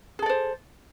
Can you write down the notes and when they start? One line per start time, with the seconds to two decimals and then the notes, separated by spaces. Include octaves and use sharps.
0.19 G#4
0.22 A4
0.26 D5
0.29 C5